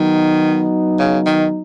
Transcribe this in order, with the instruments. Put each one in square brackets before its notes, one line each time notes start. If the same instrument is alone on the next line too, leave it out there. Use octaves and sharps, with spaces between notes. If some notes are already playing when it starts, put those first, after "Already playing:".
Already playing: [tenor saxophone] D#3 [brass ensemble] F#3 B3 D#4
[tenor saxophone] C#3
D#3